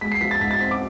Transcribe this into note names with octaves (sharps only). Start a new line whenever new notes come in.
G#3 B6
C7
F3 B6
A6
G#2 B6
A6
C4 B6
D6